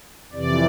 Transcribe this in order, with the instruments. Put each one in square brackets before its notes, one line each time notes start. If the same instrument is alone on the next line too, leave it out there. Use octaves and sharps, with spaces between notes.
[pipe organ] F2 C3 E3 D5